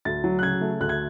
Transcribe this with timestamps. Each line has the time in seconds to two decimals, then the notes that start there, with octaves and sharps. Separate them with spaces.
0.05 D2 A6
0.24 F#3
0.39 F#6
0.42 C#3 G#6
0.61 A3
0.80 D2 F#6
0.89 G#6